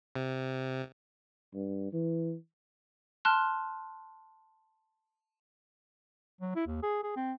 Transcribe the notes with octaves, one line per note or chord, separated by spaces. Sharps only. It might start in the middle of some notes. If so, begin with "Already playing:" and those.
C3
G2
E3
A5 C6 F6 F#6
F#3
E4
D#2
G#4
G#4
C4